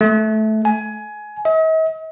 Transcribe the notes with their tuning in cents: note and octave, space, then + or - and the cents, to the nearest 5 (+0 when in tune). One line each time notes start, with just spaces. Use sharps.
A3 -15
G#5 +20
D#5 +45